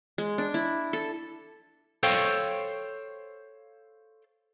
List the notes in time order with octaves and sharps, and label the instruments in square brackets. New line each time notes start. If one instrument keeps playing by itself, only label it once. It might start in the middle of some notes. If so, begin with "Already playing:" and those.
[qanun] G#3
D4
E4
A4
[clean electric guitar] A4 C5 C#5 F5 G5